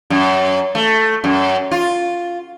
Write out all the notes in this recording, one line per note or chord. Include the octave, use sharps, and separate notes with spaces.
F#2
A3
F#2
F4